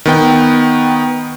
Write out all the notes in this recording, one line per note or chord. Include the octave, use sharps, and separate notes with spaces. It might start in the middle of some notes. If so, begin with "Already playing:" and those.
D#3 B3 G5